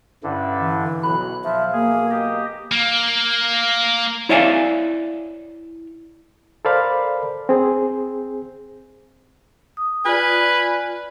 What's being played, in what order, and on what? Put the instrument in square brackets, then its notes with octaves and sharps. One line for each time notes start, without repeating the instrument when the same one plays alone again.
[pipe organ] G2 D3 [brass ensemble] C#4 E4 B4
[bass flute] E3
[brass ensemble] B1 F#3 [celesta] B5 [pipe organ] F#6
[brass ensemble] B1 F5 [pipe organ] F3 [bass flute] E5
[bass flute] A#3 [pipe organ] G#4
[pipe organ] G4 D#5
[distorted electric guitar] A#3
[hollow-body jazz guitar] E4 C#5 D5 E5 F5 G#5
[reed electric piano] A4 A#4 C5 D5 F5 B5
C4 G#4
[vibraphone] D#6
[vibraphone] F4 D5 [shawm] B4 [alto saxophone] G#5